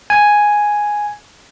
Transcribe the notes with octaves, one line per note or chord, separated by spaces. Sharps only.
G#5